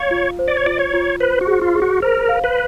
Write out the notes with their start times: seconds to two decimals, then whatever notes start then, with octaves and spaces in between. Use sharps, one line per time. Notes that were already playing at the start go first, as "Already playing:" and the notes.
Already playing: C#5 F5
0.11 F4
0.39 C5
0.48 D5
0.57 C#5
0.66 F4 D5
0.79 C#5
0.93 F4
1.20 B4 C5
1.41 F#4
1.47 G#4
1.61 F4
1.75 G#4
1.82 F#4
2.02 A#4 C5
2.29 F5
2.44 B4